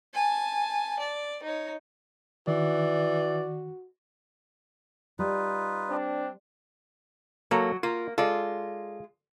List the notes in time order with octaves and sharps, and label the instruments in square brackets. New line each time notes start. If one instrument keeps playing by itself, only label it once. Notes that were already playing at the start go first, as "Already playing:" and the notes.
[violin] G#5 A5
D5
D#4 C#5
[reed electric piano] D#3 [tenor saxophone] E3 [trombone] F#4 [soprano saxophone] D5
[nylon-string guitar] G3 [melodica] D#4 F4 B4
[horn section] C4 D4
[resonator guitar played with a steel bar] F#3 [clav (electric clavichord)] A#3 A4 C#5
[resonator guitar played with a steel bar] A#3 [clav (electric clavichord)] F4
[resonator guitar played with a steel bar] G#3 F4 [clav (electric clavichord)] A4 D5